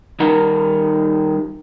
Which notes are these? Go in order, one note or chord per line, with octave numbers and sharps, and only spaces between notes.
D#3 G3 D#4 A#4 F#5 A#5